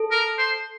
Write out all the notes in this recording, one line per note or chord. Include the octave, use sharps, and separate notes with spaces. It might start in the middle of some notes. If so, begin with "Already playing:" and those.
Already playing: A4
A#4
C5